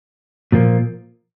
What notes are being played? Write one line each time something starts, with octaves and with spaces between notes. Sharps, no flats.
A#2 F3 A#3